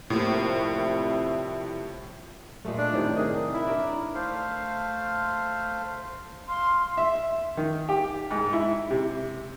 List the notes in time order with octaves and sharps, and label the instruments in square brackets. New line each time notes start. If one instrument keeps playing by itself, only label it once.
[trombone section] C2 C4 E4 [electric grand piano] A2 [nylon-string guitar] C3 F3 A#3
[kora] A#2 G#3 A3
[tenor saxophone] D4 [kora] A4
[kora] A2 C3 D#3
[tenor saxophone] D#3 [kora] G#4 D#5
[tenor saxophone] E4
[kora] D4 A#4 D5
[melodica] A3 C5 F5
[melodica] F5 [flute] C6
[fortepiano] E5
D#3
G4
G#2
E4
C3